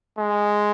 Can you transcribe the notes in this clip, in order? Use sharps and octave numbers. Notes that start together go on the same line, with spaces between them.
G#3